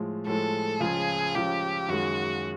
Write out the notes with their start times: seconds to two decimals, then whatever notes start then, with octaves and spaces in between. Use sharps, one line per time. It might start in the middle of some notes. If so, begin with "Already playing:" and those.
Already playing: A2 F3 G#3
0.27 A2 F3 G#3 A4
0.80 C#2 C#3 F3 G#4
1.34 C#2 C#3 F3 G4
1.88 F#2 D#3 G#3 F#4